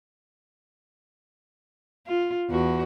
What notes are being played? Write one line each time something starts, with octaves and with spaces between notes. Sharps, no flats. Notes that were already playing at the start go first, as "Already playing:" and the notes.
F4
E2 F#4